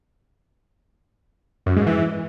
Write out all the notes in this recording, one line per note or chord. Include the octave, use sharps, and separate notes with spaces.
F#2
G#2
E3